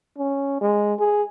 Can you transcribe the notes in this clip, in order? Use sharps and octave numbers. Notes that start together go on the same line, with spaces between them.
C#4
G#3
G#4